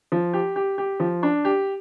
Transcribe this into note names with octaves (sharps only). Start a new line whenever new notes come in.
F3
G4
G4
G4
F3
D4
G4